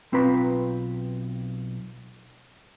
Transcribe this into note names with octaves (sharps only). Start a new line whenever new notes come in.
B1 C4 F4 B4 A#5